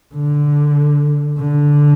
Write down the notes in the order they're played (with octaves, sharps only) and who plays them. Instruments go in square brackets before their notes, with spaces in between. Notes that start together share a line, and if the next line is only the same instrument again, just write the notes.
[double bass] D3
D3